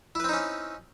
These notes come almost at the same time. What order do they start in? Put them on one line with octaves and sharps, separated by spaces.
E4 B4 C4 D#4 C#4